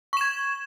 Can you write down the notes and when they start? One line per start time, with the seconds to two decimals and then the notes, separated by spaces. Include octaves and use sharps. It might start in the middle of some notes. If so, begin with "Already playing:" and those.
0.13 C#6
0.17 E7
0.21 G#6